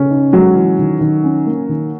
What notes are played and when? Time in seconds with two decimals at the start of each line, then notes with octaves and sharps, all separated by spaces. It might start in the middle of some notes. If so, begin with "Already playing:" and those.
Already playing: C#3 C#4
0.10 D#4
0.33 F#3 G#3
0.56 E3
0.79 D#3
1.01 D#3
1.24 C#4
1.47 A#3
1.69 D#3